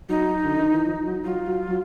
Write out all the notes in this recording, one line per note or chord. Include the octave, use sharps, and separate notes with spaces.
F#3 D#4
D3
D#3
E3
F3
F#3
F#3 F4
F#3
F#3